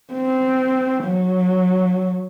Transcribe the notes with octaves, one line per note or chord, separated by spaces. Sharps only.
C4
F#3